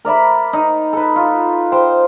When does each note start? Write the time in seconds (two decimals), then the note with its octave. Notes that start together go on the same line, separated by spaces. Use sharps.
0.05 A#4 D5 E5 B5
0.53 D#4
0.93 A4 B4
1.16 F4
1.72 C5 G5